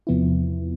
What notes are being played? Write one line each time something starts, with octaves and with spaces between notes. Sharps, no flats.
E2 C3 F3 B3 E4